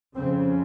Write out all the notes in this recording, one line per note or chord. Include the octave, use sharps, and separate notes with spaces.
F2 C#3 C4